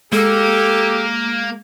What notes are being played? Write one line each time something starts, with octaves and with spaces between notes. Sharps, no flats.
G#3 A#3 G4 A4